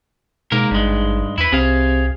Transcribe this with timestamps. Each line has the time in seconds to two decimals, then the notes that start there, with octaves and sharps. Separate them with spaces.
0.52 G#2 B2 A#3 A#4
0.71 G#1 G2 G#3
1.38 E2 E4 B4
1.52 C2 C3 G#4 F5